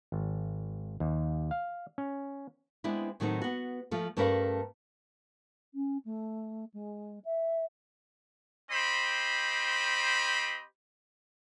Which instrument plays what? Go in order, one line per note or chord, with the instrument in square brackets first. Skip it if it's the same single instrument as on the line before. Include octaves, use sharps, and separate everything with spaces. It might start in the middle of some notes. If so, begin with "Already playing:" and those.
[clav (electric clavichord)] G#1
D#2
F5
C#4
[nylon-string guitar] G#3 B3 C4 D4 E4
A2 D#3 F#3 A3 C4 D#4
B3 F#4
F3 A3 F4
G2 A3 C#4 A#4 B4 F5
[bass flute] C#4
A3
G#3
E5
[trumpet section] C4 G4 C5 D#5 B5